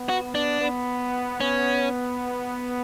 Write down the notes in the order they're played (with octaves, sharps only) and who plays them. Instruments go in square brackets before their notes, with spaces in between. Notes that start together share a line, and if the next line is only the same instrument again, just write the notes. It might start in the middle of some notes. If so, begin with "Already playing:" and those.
Already playing: [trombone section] B3
[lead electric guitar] F#4
D4
[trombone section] B3
[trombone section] B3 [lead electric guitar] C#4